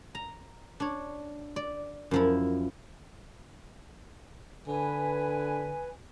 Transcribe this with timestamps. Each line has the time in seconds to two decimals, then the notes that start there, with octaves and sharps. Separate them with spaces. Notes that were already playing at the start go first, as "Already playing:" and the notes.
0.15 A#5
0.80 D4 C#5
1.56 D5
2.11 F#2 F3 E4
4.68 D3 B4 G#5